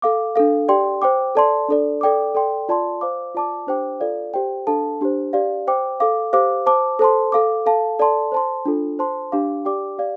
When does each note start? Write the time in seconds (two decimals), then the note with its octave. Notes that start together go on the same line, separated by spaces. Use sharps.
0.02 A4 F5 D6
0.36 D4 A4 F5
0.68 G4 D5 G5 C6
1.02 C5 G5 D6
1.35 A4 D5 A5 C6
1.68 D4 A4 D5
2.01 A4 D5 G5 D6
2.35 A4 D5 G5 C6
2.69 F4 D5 A5 C6
3.01 C5 F5 D6
3.35 F4 D5 A5 D6
3.67 D4 G4 C5 G5 D6
4.00 F4 A4 D5 F5
4.34 G4 C5 G5
4.67 D4 A4 F5 A5
5.01 D4 G4 C5
5.33 G4 D5 F5
5.67 C5 G5 D6
6.00 A4 F5 D6
6.33 G4 C5 F5 D6
6.66 C5 A5 D6
6.99 A4 C5 A5 C6
7.32 A4 F5 D6
7.66 A4 F5 A5
7.99 A4 D5 A5 C6
8.32 C5 A5 C6
8.65 D4 F4 A4
8.99 C5 A5 C6
9.32 D4 G4 F5 D6
9.65 G4 D5 G5 D6
9.98 G4 D5 F5